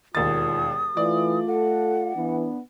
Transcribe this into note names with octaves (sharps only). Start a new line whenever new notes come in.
E1 D#2 F4 D#6 A6
E3 A3 F4 D5
A4 F#5
E3 B3 D4